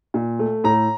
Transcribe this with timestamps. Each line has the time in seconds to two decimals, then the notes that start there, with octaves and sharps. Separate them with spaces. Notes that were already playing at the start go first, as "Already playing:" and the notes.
0.14 A#2
0.39 A3
0.64 A2 A#5